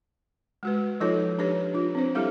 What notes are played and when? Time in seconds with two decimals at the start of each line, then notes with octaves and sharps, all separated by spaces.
0.63 G#3 F#4 B4
1.00 F3 D#4 F4 A4 C#5
1.39 D4 G4 B4 C#5
1.74 D4 F4
1.95 C4 D4 C5
2.15 G3 E4 G4 A4 F5